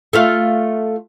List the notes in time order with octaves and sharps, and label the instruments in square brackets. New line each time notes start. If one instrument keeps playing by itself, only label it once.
[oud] A3 F4 F5